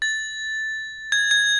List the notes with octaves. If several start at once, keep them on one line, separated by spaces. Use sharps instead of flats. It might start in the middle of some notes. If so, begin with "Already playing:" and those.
A6
G#6
G#6